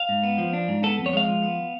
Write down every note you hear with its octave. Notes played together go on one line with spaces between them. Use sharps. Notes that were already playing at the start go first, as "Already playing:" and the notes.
Already playing: F5
G#2
B3
F3
D4
G#2
B3 A4
F2
C#5
G#3 F5
F3
B3